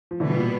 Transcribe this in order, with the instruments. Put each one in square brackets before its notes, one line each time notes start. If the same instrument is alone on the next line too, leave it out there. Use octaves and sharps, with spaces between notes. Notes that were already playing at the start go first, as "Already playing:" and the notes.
[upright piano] F3
[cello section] B2 G3 B3 [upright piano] D3 E3
[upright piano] A#2